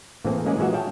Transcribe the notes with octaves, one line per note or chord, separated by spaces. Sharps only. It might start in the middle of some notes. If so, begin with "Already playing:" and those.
A2 E3 A#3 C4 G#4
E3 G#3 A#3 C#4 G#4 D5
A#2 E3 G#3 F#4 E5 F#5
G#4 C#5 E5 F5 G5 A5